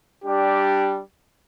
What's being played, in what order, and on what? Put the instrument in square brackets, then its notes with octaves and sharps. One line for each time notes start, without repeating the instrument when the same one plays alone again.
[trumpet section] G3 D4 G4